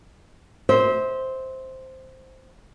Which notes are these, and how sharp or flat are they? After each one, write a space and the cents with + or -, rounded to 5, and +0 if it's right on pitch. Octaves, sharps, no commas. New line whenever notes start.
C5 +0 E5 -35